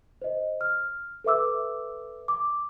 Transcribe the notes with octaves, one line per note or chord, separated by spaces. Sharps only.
C5 D#5
F6
A4 B4 E5 D6 E6
D6